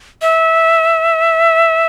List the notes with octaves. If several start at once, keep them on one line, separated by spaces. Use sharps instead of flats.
E5